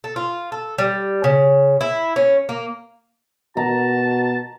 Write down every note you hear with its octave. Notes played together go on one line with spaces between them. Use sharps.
A4
F4
A4
G3
C#3
E4
C#4
A#3
B2 F#4 A5 A#5